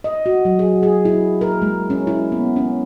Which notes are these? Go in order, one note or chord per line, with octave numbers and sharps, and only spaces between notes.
D#5
F#4
F#3
G#4
G#4
E4
A#4
G#3
C#4
E4
B3
C#4